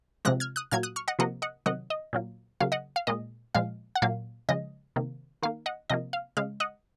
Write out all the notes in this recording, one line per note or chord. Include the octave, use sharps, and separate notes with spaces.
C3 F3 G#3 F#6 A#6
F6 G#6
D#6 F#6
A#2 F#3 A#3 F6 G#6
D#6 F#6
C#6 F6
D#5 F#5
C3 F3 A#3 D#5 F#5
D#5 F#5
C3 D#3 F#3 D#5 F#5
D#5
A#2 F#3 A#3
C#3 F#3 A#3 F5
D#5 F#5
F5
A#2 G#3 D#5
A#2 F3 G#3 F5
F#5
A#2 F#3 A#3 F5
C#3 F3 G#3 D#5
C3 D#3 A#3
D#3 A#3 F5
D#5 F#5
C3 F3 A#3 D#5
F5
C#3 G#3 F5
D#5 F#5